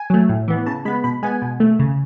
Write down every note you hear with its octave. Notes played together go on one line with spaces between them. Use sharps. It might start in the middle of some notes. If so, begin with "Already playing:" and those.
Already playing: G#5
F#3 A3
A2
E3 B3
C#3 A5
G#3 B3 B5
B2 B5
G#3 B3 G#5
B2
A3
C#3